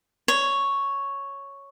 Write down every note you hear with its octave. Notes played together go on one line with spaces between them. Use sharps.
C#5